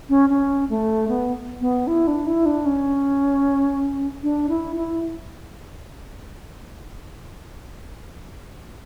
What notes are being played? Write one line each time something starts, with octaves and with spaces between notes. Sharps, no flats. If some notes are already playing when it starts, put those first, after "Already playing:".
C#4
C#4
A3
B3
B3
E4
D4
E4
D4
C#4
D4
E4
E4